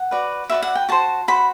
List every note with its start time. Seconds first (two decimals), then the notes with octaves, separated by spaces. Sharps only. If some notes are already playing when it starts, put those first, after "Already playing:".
Already playing: F#5
0.11 F#4 B4 D5
0.50 F#4 B4 D5 E5
0.62 F#5
0.75 G5
0.89 F#4 C5 A5
1.28 F#4 C5 B5